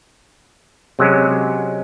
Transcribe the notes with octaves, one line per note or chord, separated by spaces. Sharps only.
C3 F#3 G#3 C#4